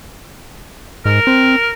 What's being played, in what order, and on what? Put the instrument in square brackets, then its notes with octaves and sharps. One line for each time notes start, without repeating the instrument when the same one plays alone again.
[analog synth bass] G#2 [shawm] A#4
[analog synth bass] C4